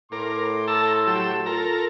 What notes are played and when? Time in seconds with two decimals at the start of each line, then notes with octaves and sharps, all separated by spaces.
0.12 A2 A#4 C6 D6
0.68 A4 A5 A#5 E6
1.07 F#3 G4 A5 E6
1.46 F4 A4 A#4 A#5